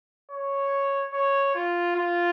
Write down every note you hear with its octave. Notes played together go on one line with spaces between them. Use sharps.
C#5
C#5
F4
F4